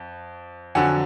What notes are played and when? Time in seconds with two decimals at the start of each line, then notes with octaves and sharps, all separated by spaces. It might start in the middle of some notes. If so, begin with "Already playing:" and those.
Already playing: F2
0.75 F2 D3 F#3 F#5 G#5